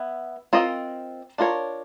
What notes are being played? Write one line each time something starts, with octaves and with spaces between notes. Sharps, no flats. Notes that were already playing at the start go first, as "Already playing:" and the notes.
Already playing: B3 E4
C4 F4 A#4 D#5
D4 F4 A#4 C#5